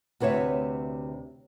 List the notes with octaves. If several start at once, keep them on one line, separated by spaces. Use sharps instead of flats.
D2 C3 B4 C#5 E5